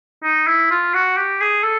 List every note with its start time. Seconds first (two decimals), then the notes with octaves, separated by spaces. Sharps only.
0.23 D#4
0.47 E4
0.71 F4
0.94 F#4
1.17 G4
1.41 G#4
1.64 A4